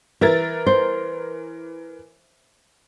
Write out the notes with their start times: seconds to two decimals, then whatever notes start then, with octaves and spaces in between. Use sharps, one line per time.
0.21 E3 A#4 E5 A6
0.66 C5